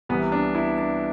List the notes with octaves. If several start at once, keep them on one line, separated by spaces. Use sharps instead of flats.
C2 C3 E3 G3 B3
D4
E4
D4